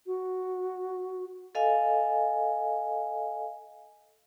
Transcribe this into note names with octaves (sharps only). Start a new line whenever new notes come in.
F#4
A4 D#5 F5 G#5